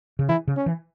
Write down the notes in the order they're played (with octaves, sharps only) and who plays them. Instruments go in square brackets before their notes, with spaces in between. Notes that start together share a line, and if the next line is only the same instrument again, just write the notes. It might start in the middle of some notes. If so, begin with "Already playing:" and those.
[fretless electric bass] C#3
[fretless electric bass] E3 [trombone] E4
[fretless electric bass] C#3
[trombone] C#4
[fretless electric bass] E3